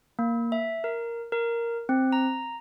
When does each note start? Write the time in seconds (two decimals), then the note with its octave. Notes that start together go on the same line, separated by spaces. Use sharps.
0.19 A#3
0.52 E5
0.84 A#4
1.32 A#4
1.89 C4
2.12 A#5